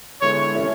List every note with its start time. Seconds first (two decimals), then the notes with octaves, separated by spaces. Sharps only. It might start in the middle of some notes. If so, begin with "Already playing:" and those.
0.21 D3 G#3 B3 E4 C#5
0.54 E3 A3 C#4 E4